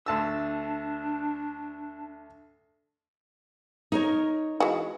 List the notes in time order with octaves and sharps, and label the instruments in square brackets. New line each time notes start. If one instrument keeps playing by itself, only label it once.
[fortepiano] D2 A5 E6 [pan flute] D4
[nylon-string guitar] D#4 A#4 C#5
[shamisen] E3 G#3 F#4